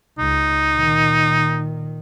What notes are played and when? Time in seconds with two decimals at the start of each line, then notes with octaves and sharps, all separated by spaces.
0.19 C#2 D#4
0.72 A#2 D#3